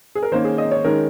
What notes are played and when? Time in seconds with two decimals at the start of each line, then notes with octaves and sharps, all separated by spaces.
0.15 G#4
0.23 A#4
0.32 D#3 A#3 C#4 C5
0.44 G#4
0.58 D#5
0.72 C#5
0.84 D#3 G#3 C#4 A#4